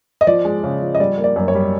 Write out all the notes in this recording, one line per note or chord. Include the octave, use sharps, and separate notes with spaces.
D#5
F3 D5
G#3
C#3
F3
D#5
G3 D5
A#3
D5
F#2
C#5
G3